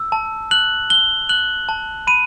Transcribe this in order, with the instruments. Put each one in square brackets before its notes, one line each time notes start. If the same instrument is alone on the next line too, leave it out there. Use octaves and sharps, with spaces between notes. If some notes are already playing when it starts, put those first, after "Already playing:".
Already playing: [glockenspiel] E6
A5
F#6 F#7
F#6 G7
F#6 F#7
A5
B5 D#7